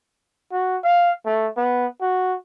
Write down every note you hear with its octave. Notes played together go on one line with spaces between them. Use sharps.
F#4
F5
A3
B3
F#4